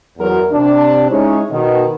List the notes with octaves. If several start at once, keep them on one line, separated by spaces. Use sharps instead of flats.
E2 F#3 A#4
C3 D4
G#3 C#4 D#4 E4 C#5
B2 D#3